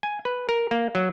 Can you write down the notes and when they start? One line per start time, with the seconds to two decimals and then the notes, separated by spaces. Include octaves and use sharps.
0.03 G#5
0.25 B4
0.49 A#4
0.71 A#3
0.95 F#3